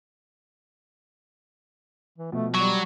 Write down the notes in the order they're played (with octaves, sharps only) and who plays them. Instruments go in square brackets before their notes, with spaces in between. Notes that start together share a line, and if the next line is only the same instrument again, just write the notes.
[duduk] E3
[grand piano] B2 F3 [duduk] A3
[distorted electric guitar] F#3 [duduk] G3 [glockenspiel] C#6